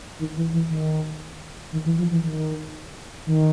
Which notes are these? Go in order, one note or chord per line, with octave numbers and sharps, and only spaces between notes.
D#3
E3
E3
D#3
D#3
E3
F3
E3
D#3
D#3